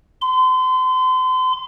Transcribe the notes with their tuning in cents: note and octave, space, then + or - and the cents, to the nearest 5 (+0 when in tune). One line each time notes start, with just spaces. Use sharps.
C6 -35